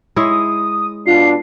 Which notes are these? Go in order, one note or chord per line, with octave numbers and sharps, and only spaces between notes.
G#3 E4 C#5 D#6
B2 D4 F4 C7